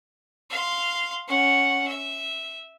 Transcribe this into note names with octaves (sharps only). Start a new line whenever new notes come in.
F5 C6
C#4 F#5
E5